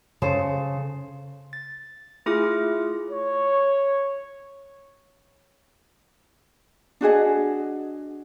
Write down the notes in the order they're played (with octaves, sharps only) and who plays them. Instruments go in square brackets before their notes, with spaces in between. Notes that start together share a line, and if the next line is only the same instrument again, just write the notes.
[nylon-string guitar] C#3 A4 C5
[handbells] A6
A3 E4 F4 G#4 D6 F6
[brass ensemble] C#5
[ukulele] D4 F#4 G#4 D#5